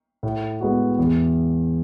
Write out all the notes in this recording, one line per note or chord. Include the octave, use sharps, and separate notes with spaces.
A2
G#3 B3 F#4
E2